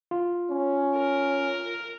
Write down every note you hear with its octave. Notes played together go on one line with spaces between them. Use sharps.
F4
C#4
A#4